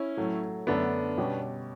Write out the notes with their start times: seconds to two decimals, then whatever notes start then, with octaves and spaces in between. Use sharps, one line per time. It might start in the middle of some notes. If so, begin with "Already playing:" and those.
Already playing: C#4 E4
0.17 A2 F#3 A3
0.67 F#2 D3 A3 B3 D4
1.17 B2 G3 C#4 G4